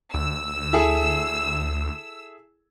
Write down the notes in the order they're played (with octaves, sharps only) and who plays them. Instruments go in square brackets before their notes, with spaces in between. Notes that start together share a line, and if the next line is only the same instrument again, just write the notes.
[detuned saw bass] D2 [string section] E6
[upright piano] E4 G#4 A4